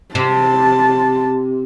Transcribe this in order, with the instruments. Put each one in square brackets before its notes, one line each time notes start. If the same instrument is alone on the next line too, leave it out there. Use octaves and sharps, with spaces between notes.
[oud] C3 [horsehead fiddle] A5